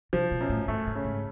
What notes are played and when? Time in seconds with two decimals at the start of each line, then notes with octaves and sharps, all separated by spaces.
0.13 C3 F3
0.31 B2
0.41 F#2
0.50 A2
0.68 G#2 A3
0.87 G#2
0.95 C#3
1.05 G#2